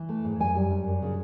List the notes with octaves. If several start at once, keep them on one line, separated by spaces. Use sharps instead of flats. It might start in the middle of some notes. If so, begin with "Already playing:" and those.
Already playing: E3
A3
G#2
F#2 G#5
G3
F#2
F#2
C#3